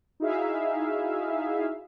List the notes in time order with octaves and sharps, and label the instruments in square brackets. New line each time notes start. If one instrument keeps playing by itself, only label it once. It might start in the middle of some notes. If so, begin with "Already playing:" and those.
[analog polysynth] D#4 E4 F#4 G#4 E5 F5